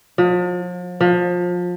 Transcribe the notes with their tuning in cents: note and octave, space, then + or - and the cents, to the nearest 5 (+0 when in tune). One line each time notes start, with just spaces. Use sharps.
F3 +40
F3 +25